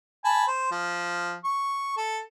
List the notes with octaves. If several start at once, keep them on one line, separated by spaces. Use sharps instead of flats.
G#5 A5 B5
C5
F3
C#6
A4